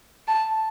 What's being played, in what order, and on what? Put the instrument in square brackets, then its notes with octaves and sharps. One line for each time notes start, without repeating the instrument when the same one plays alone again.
[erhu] A5